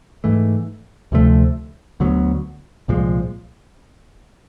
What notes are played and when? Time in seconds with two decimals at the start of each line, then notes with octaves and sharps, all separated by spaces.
0.24 G#2 E3 A3
1.12 D2 C3 F3 A3
2.00 D2 D3 F#3 B3
2.88 C2 A#2 F3 G#3